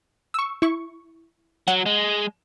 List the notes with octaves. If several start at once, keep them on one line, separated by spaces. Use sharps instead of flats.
C#6 E6
E4 C#6
F#3 F#5
G#3